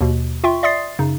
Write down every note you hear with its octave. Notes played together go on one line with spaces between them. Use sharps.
D#2 B2
F4 E5 G5 C6 C#6
D5 E5 C6 D#6 A6 C7
F#2 C#3 D#4